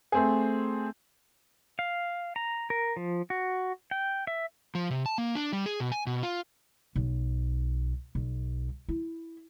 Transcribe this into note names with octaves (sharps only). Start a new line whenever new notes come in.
A3 C4 G#4
F5
A#5
A#4
F3
F#4
G5
E5
F3
C3
A5
A#3
D4
G3
G#4
B2
G#5
B2
F4
B1
B1
E4